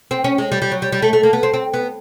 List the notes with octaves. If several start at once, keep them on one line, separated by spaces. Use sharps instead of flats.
C4
C#4
G#3
G3
G3
F#3
G3
G3
A3
A3
A#3
B3
C4
C4
B3